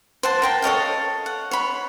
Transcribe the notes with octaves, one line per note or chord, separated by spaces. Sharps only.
C5 F#5 A5
A#4 G5 A5
A4 C#5 D#5 F5
F#5
C#5 B5